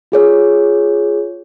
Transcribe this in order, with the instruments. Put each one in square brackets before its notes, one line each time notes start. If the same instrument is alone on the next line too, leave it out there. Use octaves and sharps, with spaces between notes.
[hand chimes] F4 G#4 C#5